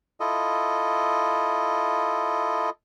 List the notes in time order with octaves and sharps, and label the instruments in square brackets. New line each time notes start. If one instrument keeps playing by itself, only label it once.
[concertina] E4 F4 A4 D#5